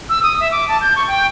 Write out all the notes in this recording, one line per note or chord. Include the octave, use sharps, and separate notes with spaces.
E6
D#6
E5
D6
A5
G6
C#6
G5